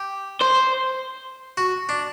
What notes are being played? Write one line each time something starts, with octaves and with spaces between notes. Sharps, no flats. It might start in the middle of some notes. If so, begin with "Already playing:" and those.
Already playing: G4
C5
F#4
D4